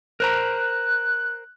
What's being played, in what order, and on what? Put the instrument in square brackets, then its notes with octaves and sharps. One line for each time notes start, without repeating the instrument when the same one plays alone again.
[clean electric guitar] A#4 C5 A#5 [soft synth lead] F#6